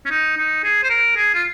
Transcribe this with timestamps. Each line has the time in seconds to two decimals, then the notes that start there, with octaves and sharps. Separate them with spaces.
0.05 C#4
0.10 D#4
0.37 D#4
0.64 G#4
0.83 C5
0.90 A#4
1.16 G#4
1.35 F4